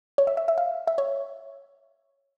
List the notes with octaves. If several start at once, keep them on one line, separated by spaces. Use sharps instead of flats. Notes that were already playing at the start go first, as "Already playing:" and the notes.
C#5
E5
E5
E5
F5
E5
C#5